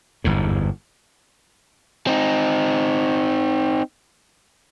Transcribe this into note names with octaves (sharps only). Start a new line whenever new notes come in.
G1 E2 G#2
C4 D#4